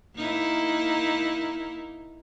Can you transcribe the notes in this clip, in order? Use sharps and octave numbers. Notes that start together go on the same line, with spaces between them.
A#3 D#4 E4